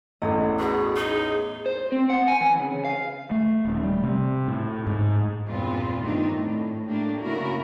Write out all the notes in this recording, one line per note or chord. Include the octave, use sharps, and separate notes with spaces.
A1 E2 A4 D#5
B2 G#4
D#4 G#4
C5
C4
F#5
G#5
E3
C#3
F5
A3
D#1
G3
C3
A2
G#2
E2 G2 A#2 B3 C4 F4
G2 D#3 A3 C4 D4 D#4
A2
A3 A#3 D4 G4
C#3 A#3 B3 E4 F#4 A#4